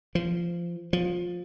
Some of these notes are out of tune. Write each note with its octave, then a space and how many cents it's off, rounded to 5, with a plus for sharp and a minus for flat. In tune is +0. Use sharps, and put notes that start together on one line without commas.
F3 -20
F3 +15